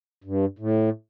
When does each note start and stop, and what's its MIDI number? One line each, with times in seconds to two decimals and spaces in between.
0.24 0.45 43
0.59 0.90 45